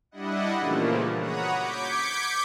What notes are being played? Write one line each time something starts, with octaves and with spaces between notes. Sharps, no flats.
G3 D4 E4 D#5 F#5
A#2 C#3 E3 F3 A3 A#3
F#4 C#5 F#5 A#5 B5 D#6
D6 G6 G#6 B6 C#7 D7